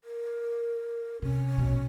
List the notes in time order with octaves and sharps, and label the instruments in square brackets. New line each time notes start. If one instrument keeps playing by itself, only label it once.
[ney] A#4
[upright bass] C3 [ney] C#4
[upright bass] A#1 B2